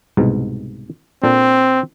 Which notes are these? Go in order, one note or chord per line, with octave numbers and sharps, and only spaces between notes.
C2 G#2 B2
A#2 C4 D4 A4